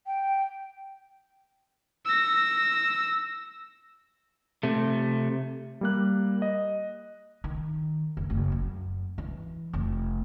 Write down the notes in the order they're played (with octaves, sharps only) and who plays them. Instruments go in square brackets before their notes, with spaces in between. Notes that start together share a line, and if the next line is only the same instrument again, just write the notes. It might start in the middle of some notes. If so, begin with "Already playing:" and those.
[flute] G5
[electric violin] E6 A#6
[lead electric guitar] C3 A3
[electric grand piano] G3 A#3 F#6
D#5
[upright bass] D#3
F1
F#1
F#2
E3
F1